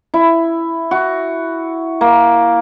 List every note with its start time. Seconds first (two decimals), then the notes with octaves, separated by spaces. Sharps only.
0.14 E4
0.91 F#4
2.01 A#3